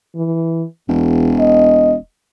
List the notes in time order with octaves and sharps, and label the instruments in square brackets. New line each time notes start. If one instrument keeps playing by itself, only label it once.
[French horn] E3
[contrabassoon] E1 [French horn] E2
[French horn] D#5